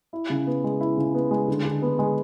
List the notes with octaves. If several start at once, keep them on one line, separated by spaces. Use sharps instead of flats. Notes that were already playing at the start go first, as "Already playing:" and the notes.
E4
C#3
B3
G#3
E4
C#3
B3
G#3
D3
D3
B3
G#3